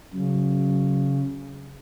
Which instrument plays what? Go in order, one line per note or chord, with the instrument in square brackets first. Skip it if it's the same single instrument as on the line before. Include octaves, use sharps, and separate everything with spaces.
[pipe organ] C#3 [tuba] F#3